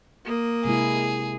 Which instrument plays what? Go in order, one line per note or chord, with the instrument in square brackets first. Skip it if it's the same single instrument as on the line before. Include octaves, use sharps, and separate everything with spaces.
[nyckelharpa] A#3 D#6
[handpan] C3 G#3 E4 [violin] G#4